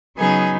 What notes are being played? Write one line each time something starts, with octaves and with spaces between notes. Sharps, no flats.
C#3 F#3 B3 D#4 G#4 G#5